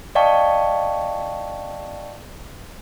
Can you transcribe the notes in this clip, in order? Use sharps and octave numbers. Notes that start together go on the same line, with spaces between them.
D5 D#5 F5 G5 A5 C#6